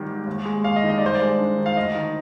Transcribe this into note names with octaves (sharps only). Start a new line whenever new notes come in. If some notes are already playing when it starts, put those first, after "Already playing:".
Already playing: G#1 D#3 G3
G#2
D#2
G#3
D#2 F5
D#5
D#3
D#5
D5
G2 C5
D5
G#3
D4
D#3
F5
D2 D#5
D#3